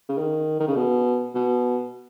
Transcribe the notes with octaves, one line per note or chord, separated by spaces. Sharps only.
C#3
D#3
D#3
C#3
B2
B2